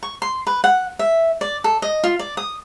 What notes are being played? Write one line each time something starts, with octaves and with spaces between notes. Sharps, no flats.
C#6
C6
B4
F#5
E5
D5
A4
D#5
F4
D5
D#6